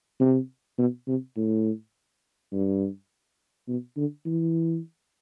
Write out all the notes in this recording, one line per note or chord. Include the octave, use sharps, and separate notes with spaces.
C3
B2
C3
A2
G2
B2
D3
E3